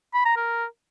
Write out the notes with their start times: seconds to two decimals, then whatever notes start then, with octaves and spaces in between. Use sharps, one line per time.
0.14 B5
0.25 A#5
0.37 A#4